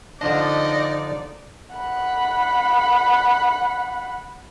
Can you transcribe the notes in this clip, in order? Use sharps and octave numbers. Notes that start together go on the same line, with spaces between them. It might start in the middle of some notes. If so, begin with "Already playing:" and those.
D3 F3 D4 D#4 D5 D#5
F#5 B5